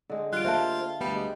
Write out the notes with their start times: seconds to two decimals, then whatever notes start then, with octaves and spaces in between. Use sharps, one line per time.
0.10 D3 G#3 C4
0.33 G3 F4 F#6 D7
0.45 A#3 A4 C5 E5 F5 A5
1.01 D2 G3 B3
1.14 G#3 G4